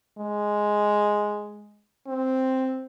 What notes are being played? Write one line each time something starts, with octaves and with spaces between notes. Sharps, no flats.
G#3
C4